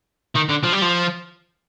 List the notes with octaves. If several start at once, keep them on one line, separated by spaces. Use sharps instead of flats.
D#3
D3
F3
G3
F3